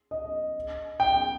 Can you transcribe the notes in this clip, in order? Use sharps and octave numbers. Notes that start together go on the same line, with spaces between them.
D#5
G5